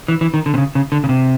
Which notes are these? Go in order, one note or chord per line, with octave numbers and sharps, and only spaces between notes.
E3
E3
D#3
D3
C3
C#3
C#3
D3
C#3
C3